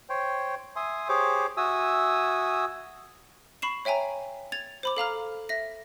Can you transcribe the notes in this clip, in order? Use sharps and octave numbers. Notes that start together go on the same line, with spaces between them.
C5 C#5 G5
E5 G#5 C6 D#6
G4 G#4 C5 C#5 D6
F#4 E5 G#5 D#6 E6
B5 C#6 C7 E7
C#5 E5 G5 G#5 A#5
G#6 A6 F7
C5 B5 D6
A4 F5 A#5 F6
E5 A#6